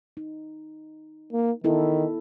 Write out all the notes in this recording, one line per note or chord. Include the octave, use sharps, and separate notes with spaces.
D#4
A#3
D#3 B3 E4 A4